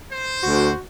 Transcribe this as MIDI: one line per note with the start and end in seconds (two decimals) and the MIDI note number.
0.12 0.74 72
0.43 0.72 38
0.43 0.81 66